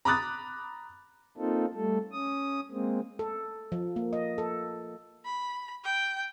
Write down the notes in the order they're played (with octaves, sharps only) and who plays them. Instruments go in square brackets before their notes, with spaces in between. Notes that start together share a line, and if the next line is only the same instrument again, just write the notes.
[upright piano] A#5 B5 D6 D#6 F#6 A6
[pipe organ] A#3 C4 D#4 F4 A4
G3 A3 A4
C#4 D#6
G#3 A#3 C4
[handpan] A4
F3
A#3
D#5
A4
[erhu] B5
G5